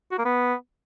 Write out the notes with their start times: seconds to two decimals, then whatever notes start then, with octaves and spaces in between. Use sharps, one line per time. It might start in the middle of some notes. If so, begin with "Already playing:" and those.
0.12 F#4
0.18 A#3
0.25 B3